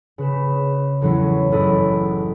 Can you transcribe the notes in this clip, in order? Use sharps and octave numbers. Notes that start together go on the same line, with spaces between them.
C#3 B4 E7
E2 A2 E3 F#3 C#4 E4
F#1 A2 E4 D5 D#5